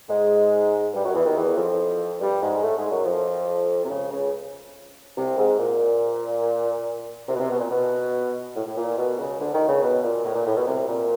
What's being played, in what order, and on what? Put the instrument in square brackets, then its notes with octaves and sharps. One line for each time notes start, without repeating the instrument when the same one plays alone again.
[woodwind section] G#2 G#3
G2 G3
F#2 F#3
E2 E3
D#2 D#3
E2 E3
F2 F3
G2 G3
G#2 G#3
A2 A3
G#2 G#3
F#2 F#3
F2 F3
C3
C#2 C#3
C#2 C#3
C2 C3
G#2
A#2
C2 C3
B2
C2 C3
B2
A#2
B2
A2
A2
A#2
B2
C#2 C#3
D2 D3
D#2 D#3
C#2 C#3
B2
A#2
A2
A#2
A2
B2
C2 C3
A#2